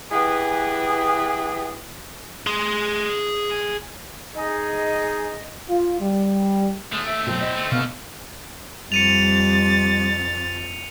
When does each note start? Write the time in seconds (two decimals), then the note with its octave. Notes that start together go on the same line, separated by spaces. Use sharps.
0.12 E3 B3 G4 G#4
2.47 G#4 C6
4.35 D#4 G#4 D#5
5.68 F4
6.00 G3
6.92 D#2 G#3 A3
7.07 E5 D7
7.27 B2 F#3 C4
7.41 E2 D#5
7.56 D3 A3
7.72 B2 F5 C#6
8.92 F2 G3 A6 C#7 D#7 F7